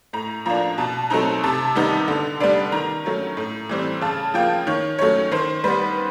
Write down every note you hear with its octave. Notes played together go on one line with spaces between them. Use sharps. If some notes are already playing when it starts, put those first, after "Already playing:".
A2 A#5
F3 A#3 D4 A#5
B2 A5
F#3 A3 C4 D#4 A#5
C3 A5
D#3 G3 B3 D#4
D3
G3 B3 D4
D#3 A#5
F#3 A3 C#4
A2
E3 G3 C4
C#3 A5
F3 A#3 G5
D#3 C#5
F#3 A3 C#4 C#5
D#3 C5
G3 B3 B4